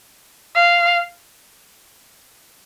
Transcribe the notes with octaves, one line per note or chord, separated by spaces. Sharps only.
F5